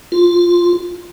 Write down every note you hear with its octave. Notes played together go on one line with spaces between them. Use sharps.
F4